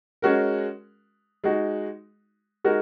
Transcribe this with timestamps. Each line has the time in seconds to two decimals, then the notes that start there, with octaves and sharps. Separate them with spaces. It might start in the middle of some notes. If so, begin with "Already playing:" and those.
0.22 G#3 C#4 F#4 A#4
1.44 G#3 D#4 F#4
2.64 G#3 D#4 F#4 A#4